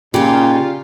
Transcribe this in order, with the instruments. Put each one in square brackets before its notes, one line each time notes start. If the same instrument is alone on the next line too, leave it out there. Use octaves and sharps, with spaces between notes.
[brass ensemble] A#2 [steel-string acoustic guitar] C#3 D#4 [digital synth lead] F4 [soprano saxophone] G4